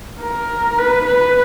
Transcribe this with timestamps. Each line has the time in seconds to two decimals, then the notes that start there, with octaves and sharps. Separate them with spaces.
0.21 A#4
0.78 B4
1.07 B4